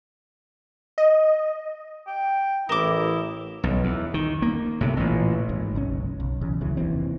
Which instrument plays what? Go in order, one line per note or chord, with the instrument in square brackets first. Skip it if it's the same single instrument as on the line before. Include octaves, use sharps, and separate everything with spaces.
[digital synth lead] D#5
[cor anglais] G5
[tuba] A1 [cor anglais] E4 [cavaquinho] A#4 D6 [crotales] D#6 E7 G7
[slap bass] B1
E2
D#3
A#3
A2 C3
A1 A#2
[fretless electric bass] G#1 G#2
F#1 B1 C#4
B1
B1 E2 C#3
D2 C#3 E3 F#3
F1 D#2 E3 C4